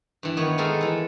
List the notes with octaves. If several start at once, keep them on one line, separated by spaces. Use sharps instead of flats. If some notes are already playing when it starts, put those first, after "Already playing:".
G2 E3
D#3 B3 C#5
G#3 B3 D#4 A4 A#4
E3 A4